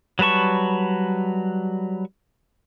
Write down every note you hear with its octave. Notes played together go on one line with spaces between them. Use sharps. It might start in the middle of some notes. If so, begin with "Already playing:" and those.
F#3 G3 B4 A5 C#6